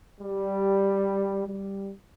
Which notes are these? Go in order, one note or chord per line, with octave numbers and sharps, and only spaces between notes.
G3
G3